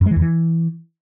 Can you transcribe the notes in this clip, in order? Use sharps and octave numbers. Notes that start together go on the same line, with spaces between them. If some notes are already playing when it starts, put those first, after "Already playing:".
F#2
G#3
E3
E2
E3